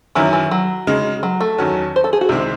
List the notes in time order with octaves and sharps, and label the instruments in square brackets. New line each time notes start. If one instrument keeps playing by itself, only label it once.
[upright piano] F#2 D#3 F#3 C#4 E4 [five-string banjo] E3
[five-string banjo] E3
F#3
[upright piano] C#3 G#3 D#4
[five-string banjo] F#3
A3
[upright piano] E2 D#3 F#3 C#4 F#4
[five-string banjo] C5
A4
G#4
F#4
[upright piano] C2 C3 D#3 G#3 C4 [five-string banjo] E4